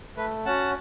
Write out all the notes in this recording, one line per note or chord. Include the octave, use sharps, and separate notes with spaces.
A3 B4
C#4 F#4 F#5 A5